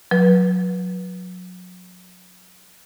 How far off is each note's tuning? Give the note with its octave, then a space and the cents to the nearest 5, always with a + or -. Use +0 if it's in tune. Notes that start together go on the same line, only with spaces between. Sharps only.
F#3 -30 B4 -25